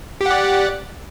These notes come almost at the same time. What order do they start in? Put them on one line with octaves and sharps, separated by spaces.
G4 F#5 D5